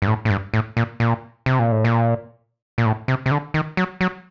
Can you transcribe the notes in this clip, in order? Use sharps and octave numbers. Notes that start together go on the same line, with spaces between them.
G2
A2
A2
G2
A2
A#2
A#2
C3
A#2
A2
A#2
A#2
A2
C3
C3
D3
D#3
F#3
F#3